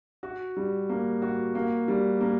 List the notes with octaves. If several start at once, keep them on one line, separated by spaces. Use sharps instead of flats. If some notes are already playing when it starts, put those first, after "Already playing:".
F#4
G3
A#3
F#4
A#3
G3
A#3